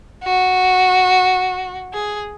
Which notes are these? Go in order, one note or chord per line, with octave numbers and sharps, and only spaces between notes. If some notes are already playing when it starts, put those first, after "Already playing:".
F#4
G#4